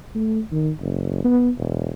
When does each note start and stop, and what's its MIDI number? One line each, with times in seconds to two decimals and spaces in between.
0.15 0.41 57
0.52 0.70 51
0.80 1.21 30
1.24 1.50 59
1.58 1.91 28